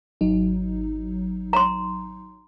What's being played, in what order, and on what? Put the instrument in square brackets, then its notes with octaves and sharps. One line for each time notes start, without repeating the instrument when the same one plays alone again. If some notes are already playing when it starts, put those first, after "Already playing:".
[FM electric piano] G#1 F#3 D#4
[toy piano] A#5 C6